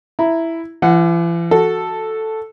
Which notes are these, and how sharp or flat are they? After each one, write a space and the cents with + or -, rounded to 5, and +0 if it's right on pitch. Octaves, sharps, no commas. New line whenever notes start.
E4 +0 A#5 +0
E3 +45 F#5 +0
F#4 +0 A4 +0